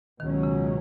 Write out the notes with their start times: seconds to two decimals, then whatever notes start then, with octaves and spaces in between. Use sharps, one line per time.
0.20 C#2 B2 D#3 F#3 C#4
0.43 C#3